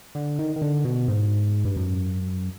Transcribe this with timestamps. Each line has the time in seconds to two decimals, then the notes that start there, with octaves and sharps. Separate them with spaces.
0.15 D3
0.39 D#3
0.56 D#3
0.62 D3
0.85 B2
1.08 G#2
1.65 G2
1.77 F#2